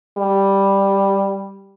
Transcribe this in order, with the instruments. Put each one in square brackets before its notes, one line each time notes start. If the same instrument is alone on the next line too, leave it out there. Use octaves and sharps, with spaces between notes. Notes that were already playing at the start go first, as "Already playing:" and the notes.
[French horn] G3